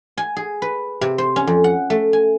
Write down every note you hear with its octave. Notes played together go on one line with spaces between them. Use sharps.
G#5
G#4
B4
C3
C5
C#4
F2
F#5
A3
G#5